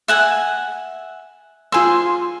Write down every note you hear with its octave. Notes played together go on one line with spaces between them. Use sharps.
E5 F#5 G#5
F4 G#4 C5 G#5 E6